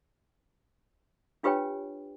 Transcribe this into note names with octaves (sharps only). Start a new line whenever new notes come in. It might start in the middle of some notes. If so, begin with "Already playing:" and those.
D4 F4 G4 B4 C#5 G5